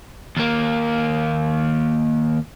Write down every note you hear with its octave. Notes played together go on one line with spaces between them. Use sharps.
D#2 A#3